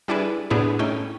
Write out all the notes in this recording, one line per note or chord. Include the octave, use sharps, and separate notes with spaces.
G3 D4 E4 G#4 B4
A2 B3 D4 E4 G4 G#4
A3 C#4 D#4 E4 G5